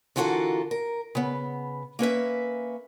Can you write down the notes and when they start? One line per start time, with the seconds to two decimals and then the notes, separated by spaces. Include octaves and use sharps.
0.16 D3 E3 F4 F#4 A4 A#4
0.71 A#4
1.15 C#3 B3
1.99 A#3 C#4 B4 E5